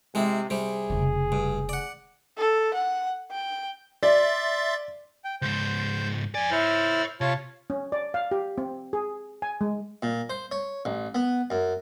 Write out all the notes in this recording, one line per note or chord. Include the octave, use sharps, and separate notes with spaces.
C3 G#3 E4
C3 G3 C4 G#4
F1 C#3
G2
D5 F#5
A4
F#5
G5
D5 E5 C6 A6
G5
C#2 G#2 C5 G6
F2 D5 G#5
E4 C5 C#5 E5 F6
C3 F4 C#5 A5
C#4
D5
F5
G4
C4
G#4
G#5
G#3
A#2
C5
C#5
A1
B3
F#2